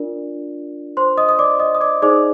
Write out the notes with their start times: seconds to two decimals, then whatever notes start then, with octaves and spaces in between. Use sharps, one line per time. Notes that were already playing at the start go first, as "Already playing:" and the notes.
Already playing: D4 F4 A#4 D5
0.97 C5 C6
1.18 D#5 D#6
1.29 D#6
1.39 D5 D6
1.60 D#5 D#6
1.75 D#6
1.81 D5 D6
2.02 D#4 G#4 C5 D5 D6